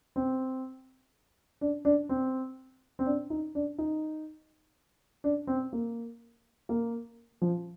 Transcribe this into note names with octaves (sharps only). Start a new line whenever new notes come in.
C4
D4
D4
C4
C4
D4
D#4
D4
D#4
D4
C4
A#3
A#3
F3